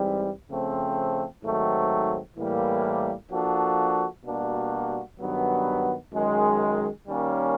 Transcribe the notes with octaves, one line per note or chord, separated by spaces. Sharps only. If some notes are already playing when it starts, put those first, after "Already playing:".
Already playing: G#2 E3 G3 C4
C#3 F3 A3 C4
G#2 D#3 F#3 A3 C4
A2 E3 G3 A#3
F3 A#3 D4 F#4 A4
B2 G3 A#3 D4 F#4
G2 D#3 F#3 B3
F#2 D#3 G#3
D#3 G3 A#3 C#4